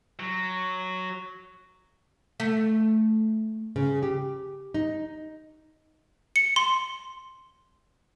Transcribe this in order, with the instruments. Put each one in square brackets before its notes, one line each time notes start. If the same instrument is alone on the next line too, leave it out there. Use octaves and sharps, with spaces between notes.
[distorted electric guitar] F#3
[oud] A3
[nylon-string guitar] C#3
G4
D#4
[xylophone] C#7
C6